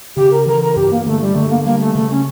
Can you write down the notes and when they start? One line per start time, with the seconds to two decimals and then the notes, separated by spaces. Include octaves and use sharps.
0.16 C#3 G4
0.31 A#4
0.46 E3 A#4
0.62 A#4
0.76 G2 G4
0.91 A#3
1.06 D3 A3
1.21 G3
1.35 D3 A3
1.50 A#3
1.65 G3 A#3
1.80 A3
1.95 C#3 A3
2.10 C#4